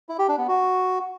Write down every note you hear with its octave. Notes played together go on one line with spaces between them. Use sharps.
E4
G4
D4
B3
F#4